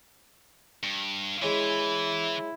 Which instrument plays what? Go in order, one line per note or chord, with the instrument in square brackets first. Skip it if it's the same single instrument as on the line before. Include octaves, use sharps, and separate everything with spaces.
[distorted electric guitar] G2
[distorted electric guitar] E3 [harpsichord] G#3 C#4 [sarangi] E4